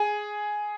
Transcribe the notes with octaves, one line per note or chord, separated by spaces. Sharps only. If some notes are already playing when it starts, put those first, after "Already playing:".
Already playing: G#4 G#5